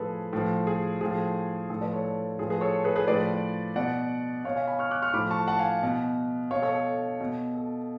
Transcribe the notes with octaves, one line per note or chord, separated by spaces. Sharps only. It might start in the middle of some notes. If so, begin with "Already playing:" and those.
Already playing: A2 F3 G#4 A4 B4
A2 F3
G#4
A2 F3 G#4
A2 F3 A4
B4 D5
A4 C#5
A4
A2 F3 G#4
G#4 B4
A4 C#5
G#4 B4
G#4 B4
A2 F3 B4 D5
B2 D5 F#5
B2 C#5 F5
F5 G#5
G#5 B5
C#6 F6
D6 F#6
C#6 F6
A2 F3 B5 D6
A5 C#6
F#5 A5
F5 G#5
B2
B2 C#5 F5
A4 C#5
A4
B2
A4